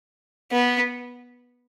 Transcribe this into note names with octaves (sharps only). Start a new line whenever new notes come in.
B3